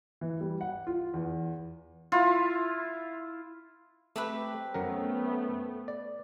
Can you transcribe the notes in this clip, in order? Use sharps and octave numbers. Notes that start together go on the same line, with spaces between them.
E3
G3
F#5
F4
E2
E4 F4
A3 C4 G4 B4
F#2 F#3 A3 B3 A#4
D5